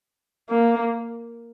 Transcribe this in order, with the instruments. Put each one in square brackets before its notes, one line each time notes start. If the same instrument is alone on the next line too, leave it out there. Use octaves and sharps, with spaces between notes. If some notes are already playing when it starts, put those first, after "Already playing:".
[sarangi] A#3